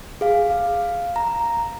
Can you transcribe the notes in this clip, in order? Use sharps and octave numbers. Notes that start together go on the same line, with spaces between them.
G#4 F5
F5
A#5